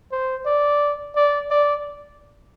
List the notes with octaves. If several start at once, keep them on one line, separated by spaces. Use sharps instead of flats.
C5
D5
D5
D5